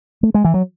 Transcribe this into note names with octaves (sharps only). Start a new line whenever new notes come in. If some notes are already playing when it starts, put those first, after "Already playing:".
A3
G#3
E3
F#3